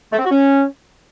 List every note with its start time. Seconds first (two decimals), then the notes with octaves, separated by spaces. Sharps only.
0.13 A3
0.19 C4
0.25 F#4
0.31 C#4